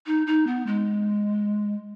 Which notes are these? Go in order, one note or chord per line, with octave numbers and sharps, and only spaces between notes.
D#4
D#4
B3
G#3